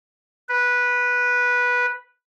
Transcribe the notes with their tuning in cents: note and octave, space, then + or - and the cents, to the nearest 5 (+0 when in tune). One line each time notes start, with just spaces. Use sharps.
B4 -10